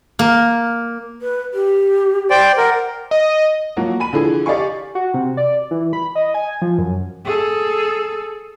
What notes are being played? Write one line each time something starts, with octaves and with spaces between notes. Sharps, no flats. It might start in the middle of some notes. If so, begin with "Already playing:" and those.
A#3
B4
G4
C5 D5 G5
A#4 F#5
D#5
F3 F#3 A#3 F#4
G#5 B5 D#7
D3 E3 F3 G#4
G4 D5 D#5 F5 G#5 C#6
F#4
C3
D5
E3
B5
D#5
G#5
F3
F#2
G#4 A4